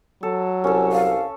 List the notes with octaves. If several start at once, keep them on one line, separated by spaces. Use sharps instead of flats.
F#3 A4
C2 C#4 A4
F5